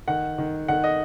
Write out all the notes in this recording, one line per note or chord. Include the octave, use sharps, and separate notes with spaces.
D#3 F#5
D#3
D#3 F#5
D#5